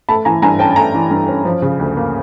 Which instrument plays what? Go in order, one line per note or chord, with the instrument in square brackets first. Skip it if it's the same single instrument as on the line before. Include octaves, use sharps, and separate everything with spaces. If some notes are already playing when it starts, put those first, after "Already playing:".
[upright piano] A3 A5 B5
E3 G#5 A#5
G2 G#5 A#5
C#4 G5 A5
A5
A3 G#5 A#5
E3
G2
C#4
F3
C#3
D2
A#3